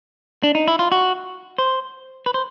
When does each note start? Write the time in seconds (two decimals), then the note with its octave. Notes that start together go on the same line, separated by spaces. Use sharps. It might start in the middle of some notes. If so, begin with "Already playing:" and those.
0.43 D4
0.55 D#4
0.68 E4
0.79 F4
0.92 F#4
1.58 C5
2.26 B4
2.34 C5